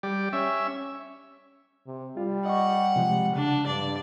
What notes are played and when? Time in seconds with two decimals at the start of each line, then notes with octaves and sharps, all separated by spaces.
0.03 G3 D5
0.33 C#4 E5
1.87 C3
2.17 G3 F4
2.46 D#5 F#5 C#6
2.96 C3 F3 G#3
3.35 C#3 D4
3.67 G2 D5